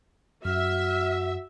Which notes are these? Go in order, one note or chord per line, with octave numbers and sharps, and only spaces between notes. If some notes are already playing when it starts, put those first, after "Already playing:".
F#2 F#4 E5 F6